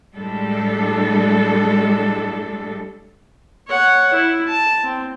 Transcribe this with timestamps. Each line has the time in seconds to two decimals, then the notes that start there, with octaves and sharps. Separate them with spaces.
0.14 A2 G3 G#3 D4 A4
3.68 C#5 F#5
4.13 E4
4.48 A5
4.84 C4